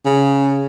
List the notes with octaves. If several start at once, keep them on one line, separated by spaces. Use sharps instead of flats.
C#3